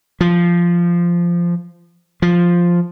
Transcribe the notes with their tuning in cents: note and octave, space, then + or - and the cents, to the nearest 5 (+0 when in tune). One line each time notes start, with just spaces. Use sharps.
F3 -10
F3 +0